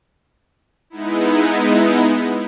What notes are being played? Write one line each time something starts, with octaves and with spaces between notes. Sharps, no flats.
G#3 B3 D#4 E4